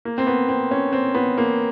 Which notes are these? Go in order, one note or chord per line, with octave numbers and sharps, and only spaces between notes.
A#3
C4
B3
C4
C#4
C4
B3
A#3